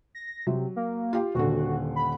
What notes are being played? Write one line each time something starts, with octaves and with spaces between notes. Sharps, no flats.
A#6
C3 F#3
A#3
F4 G4
D#1 D3 F#4
B5